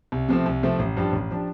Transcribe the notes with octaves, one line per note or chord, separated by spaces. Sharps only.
C2
C3 F3 A3 C4
C2
C3 F3 A3 C4
A1
G2 F3 D4 G4
A1
F3 D4 G4